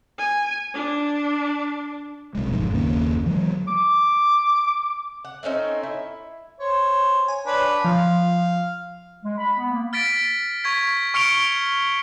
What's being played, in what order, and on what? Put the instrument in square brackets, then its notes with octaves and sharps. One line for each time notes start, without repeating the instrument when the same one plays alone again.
[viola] G#5
D4
[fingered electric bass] B1 G#3
G1 F2 G#2
F#1 D#2 A#3 C#4
E3 F#3 G#3
[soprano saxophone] D6
[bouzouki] F#5
A3 C4 C#4 D#4
E4
[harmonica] C5 C#5
[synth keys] G#5
[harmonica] D4 B4 C#5
[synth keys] F3 [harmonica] F5
[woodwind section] G#3
B5
B3
A#3
[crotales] F6 A6 B6 D7
C#6 G#6 B6
C#6 F6 C#7 D7 F7 G7